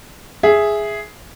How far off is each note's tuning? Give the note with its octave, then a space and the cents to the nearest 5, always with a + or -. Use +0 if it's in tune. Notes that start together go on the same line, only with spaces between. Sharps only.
G#4 +0 E5 +0